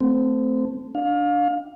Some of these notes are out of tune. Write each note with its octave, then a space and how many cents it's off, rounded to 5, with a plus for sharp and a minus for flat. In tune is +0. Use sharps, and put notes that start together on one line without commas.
A3 +0 C4 -20
D4 +0 F5 +25